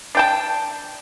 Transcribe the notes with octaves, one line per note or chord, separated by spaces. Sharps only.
D4 G5 A5